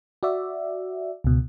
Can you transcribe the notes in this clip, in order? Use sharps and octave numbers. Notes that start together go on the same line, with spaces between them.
F#4 D5 E5
C#2 B2